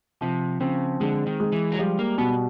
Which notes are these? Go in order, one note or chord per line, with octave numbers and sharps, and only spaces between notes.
C3 F3
C#3 C4
D3 G#3
D#3
G#3
E3
F#3
F3 G3
A#3
B2 B3